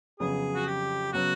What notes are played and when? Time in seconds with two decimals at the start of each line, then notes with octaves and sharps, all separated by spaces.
0.20 F2 C#3 F#3 B3 G#4
0.55 F#4
0.66 G4
1.13 C#3 F#3 B3 F#4